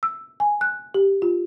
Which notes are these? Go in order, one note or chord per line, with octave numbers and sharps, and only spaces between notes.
E6
G#5
F#6
G4
F4